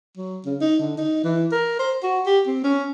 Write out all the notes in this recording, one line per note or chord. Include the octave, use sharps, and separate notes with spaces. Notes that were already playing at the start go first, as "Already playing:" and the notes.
F#3
C#3
D#4
D3
D#4
E3
A#4
C5
F#4
G4
C4
C#4